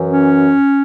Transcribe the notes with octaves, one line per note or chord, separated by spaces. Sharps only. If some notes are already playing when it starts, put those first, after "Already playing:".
Already playing: F#2 E3
C#4